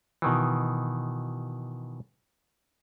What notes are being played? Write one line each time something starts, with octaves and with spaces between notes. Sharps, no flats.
B2 D#3 E3